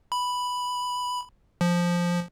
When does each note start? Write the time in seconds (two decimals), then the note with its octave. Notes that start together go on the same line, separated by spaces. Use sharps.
0.12 B5
1.61 F3